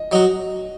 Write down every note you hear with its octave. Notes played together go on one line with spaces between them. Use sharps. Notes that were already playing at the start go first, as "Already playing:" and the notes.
Already playing: D#5
F#3 D#4 F#4